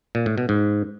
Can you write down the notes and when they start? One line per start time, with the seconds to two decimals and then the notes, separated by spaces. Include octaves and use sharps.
0.15 A#2
0.26 A2
0.38 B2
0.49 G#2